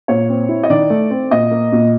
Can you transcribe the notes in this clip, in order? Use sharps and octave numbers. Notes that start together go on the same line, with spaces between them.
A#2 C#5
C4
E4
D#5
D#3 D5
A3
C4
A#2 D#5
A#3
A#2